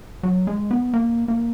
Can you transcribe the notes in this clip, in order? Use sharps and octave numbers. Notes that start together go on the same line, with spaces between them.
F#3
G#3
B3
A#3
A#3